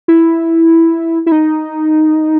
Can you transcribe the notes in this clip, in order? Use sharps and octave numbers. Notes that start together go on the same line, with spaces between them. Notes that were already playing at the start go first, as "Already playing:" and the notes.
E4
E4
D#4